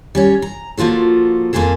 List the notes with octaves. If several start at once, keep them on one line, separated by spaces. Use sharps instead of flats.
G3 C#4 C#5
A#5
F3 A#3 F4 F#4 A4
F2 A#3 F4 F#4 G#4 A4